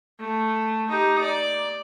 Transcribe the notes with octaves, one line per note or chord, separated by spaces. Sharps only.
A3
D#4 G4
D5